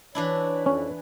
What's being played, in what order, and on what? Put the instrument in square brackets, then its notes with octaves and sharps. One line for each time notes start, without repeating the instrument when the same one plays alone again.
[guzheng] E3 D4 E4 [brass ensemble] C#5
[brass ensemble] F2 [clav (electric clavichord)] C#4